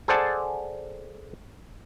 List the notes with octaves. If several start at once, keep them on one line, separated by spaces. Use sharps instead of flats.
G#4 A4 C5 D5 F#5 A5